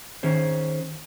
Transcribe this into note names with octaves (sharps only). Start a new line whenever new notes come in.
D#3 C#4 G#4 C5